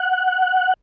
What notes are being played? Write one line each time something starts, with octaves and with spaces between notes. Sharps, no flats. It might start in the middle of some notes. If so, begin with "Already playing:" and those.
Already playing: F#5